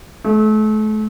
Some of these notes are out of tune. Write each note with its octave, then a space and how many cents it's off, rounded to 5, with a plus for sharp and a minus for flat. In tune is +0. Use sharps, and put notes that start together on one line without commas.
A3 -35